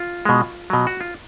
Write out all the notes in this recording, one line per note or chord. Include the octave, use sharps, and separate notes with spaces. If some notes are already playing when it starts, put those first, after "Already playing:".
Already playing: F4
B2 G#3
B2 F#3
F#4
F4